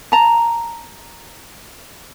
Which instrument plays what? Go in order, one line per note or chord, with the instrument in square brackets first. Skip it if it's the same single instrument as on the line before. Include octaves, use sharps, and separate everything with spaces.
[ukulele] A5 A#5